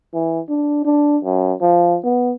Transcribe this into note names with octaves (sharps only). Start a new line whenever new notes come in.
E3
D4
D4
F#2
F3
B3